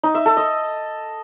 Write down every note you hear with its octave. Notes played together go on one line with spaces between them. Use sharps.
D#4
E5
A4
D#5